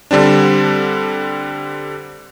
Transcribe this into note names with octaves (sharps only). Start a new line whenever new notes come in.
D3 G3 C4 D4